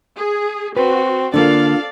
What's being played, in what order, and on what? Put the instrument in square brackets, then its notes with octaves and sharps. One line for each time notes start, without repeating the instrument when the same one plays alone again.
[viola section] G#4
[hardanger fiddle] C4 [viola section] F#4 [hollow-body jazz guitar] B4
[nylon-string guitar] D3 A#3 [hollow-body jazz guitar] D4 F4 [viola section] A4 F5 [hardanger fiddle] D5